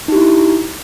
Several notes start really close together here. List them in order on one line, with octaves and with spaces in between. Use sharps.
D#4 G4 E4